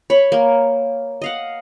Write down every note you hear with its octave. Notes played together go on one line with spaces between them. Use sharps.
C#5 B5
A#3
D#5 F5 F#5